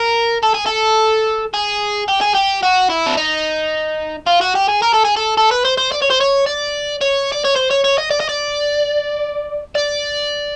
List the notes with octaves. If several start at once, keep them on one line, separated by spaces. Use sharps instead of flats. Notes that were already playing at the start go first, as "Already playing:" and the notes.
Already playing: A#4
A4
G#4
A4
G#4
G4
G#4
G4
F#4
E4
D4
D#4
F4
F#4
G4
G#4
A#4
A4
G#4
A4
A4
B4
C5
C5
D5
C#5
C5
C#5
D5
C#5
D5
C#5
C5
C#5
C#5
D#5
D5
D#5
D5
D5